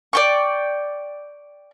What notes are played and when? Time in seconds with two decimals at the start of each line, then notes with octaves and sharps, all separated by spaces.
0.13 D5 G5 C#6